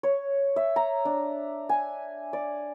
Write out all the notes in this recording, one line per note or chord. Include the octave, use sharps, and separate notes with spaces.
C#5
E5
A#5
D4
G#5
D5